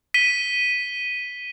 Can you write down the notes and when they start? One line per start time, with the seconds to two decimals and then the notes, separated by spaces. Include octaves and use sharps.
0.14 B6 D#7 G7